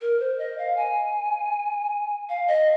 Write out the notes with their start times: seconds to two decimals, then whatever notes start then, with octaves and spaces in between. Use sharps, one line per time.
0.01 A#4
0.20 C5
0.39 D#5
0.58 F5
0.77 G#5
2.29 F5
2.47 D#5